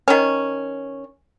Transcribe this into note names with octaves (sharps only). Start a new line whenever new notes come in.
D#3 C#4